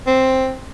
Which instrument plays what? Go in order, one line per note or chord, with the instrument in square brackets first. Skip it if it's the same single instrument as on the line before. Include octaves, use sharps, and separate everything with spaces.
[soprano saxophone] C4